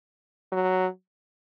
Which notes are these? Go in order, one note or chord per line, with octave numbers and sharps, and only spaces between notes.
F#3